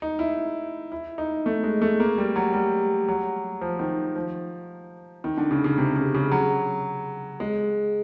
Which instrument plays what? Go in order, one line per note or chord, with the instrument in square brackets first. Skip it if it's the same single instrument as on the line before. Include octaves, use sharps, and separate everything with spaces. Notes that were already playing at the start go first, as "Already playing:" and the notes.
[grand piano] D#4
E4
E4
D#4
A3
G#3
A3
A#3
G3
F#3
G3
F#3
F3
D#3
F3
D#3
D3
C#3
C#3
C3
C#3
C#3
F#3
G#3